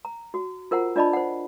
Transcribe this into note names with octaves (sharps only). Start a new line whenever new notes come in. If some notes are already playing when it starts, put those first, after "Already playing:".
A#5
F#4
F4 A#4 C5 F#5 A#5
D4 F4 D5 D#5 A5 B5
C5 F#5